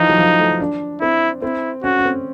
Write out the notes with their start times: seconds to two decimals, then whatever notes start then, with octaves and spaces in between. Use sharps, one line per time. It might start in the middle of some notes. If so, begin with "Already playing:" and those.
Already playing: E3 F3 D#4
0.09 F#3
0.18 F3
0.39 A3
0.60 D4
1.01 C4 E4
1.42 C4 E4
1.84 C#4 F#4
1.99 C#4
2.05 C4